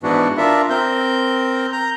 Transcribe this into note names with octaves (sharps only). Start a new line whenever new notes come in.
G#2 E3 B3 D4 F#4
D4 F4 A#4 E5
C4 A#4 G6
A#5 G6